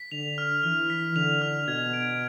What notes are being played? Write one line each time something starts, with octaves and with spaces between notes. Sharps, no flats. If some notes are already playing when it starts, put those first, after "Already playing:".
Already playing: B6
D3 F7
F6
E3 F6
B6
D3 F7
F6
B2 G#6
D7